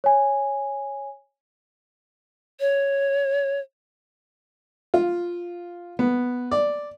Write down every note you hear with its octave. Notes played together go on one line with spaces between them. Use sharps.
C#5 G#5
C#5
F4
B3
D5